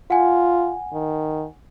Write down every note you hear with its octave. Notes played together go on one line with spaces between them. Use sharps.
F4 F#5 G#5
D#3